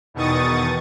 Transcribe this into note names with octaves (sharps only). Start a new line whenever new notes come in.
E2 B2 D#3 C#6 D#6 A6